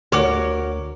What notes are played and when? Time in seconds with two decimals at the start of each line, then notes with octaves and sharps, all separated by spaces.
0.12 D2 F#4 A#4 C#5 D6 F6